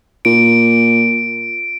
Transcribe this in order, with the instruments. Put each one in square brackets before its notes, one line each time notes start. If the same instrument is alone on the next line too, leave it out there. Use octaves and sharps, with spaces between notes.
[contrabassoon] A#2 [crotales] D7